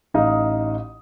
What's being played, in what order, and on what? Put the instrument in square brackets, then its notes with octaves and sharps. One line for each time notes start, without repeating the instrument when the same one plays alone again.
[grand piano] A1 D#4 F5 D#6